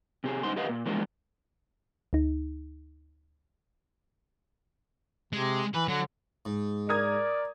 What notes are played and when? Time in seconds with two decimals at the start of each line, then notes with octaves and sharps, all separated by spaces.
0.24 C3 G4 G#4
0.43 G2 C#3 D#4 C5 F#5 C6
0.56 G4 A#4 B4 D#5 F5 F#5
0.69 A#2
0.85 E3 F3 G3 G#3 A#3 D4
2.13 D2 D#4
5.33 C3 G#3
5.74 E3 B4
5.88 D3 F#3
6.45 G#2
6.89 A#4 D5 D#6 G#6